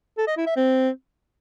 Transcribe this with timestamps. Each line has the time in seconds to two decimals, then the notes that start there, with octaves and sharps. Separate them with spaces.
0.17 A4
0.27 D#5
0.37 E4
0.47 E5
0.56 C4